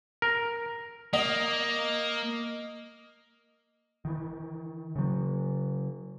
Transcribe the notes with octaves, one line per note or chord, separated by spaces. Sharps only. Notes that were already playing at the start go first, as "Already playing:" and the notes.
A#4
A#3 D#5
D#3 E3
C#3 F#3